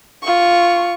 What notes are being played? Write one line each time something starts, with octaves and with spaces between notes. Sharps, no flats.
F4 C#6